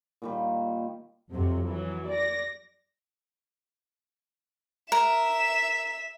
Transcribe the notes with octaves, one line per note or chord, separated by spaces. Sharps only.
A#2 D#3 G3
F2 C3 F#3
E3 F#3
D5 A#6
A#4 E5